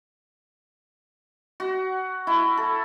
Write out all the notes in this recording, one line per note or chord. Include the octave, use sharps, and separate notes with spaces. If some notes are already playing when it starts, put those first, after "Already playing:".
F#4
E4
A4